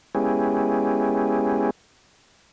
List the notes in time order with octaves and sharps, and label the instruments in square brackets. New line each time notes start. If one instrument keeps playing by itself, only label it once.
[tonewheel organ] G#3 B3 C#4 E4 G4 G#4